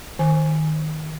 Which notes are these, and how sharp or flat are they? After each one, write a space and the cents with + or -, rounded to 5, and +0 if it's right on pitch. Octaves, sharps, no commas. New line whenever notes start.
D#3 +0 G#5 +0